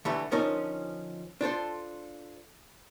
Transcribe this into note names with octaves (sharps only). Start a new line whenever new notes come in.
D3 E3 G3 A3
D3 F3 C#4 D#4 A#4
D4 F4 A4 C5